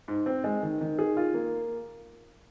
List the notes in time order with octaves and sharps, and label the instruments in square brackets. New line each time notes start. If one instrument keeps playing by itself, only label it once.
[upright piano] G#2
C4
G#3
D#3
D#3
G#4
F4
A#3